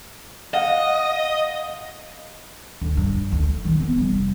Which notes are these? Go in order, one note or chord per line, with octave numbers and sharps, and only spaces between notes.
D#5 F5 F#5
D2 D3
G2 G3
D2
D#3 E3
B3 C4
F1 G3